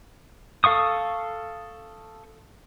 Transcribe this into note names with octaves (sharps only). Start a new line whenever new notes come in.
A4 F5 C#6 D#6